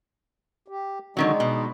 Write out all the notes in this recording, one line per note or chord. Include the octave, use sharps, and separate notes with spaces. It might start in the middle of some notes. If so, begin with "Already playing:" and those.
G4
D3 D#3 F#3 G#3 D#4
B2